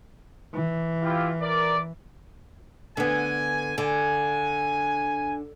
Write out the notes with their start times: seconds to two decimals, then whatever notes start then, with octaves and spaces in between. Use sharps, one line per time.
0.54 E3
1.03 E4 F4 G4
1.41 A#4 D5
2.97 D3 B3 G#5
3.78 D3 G#5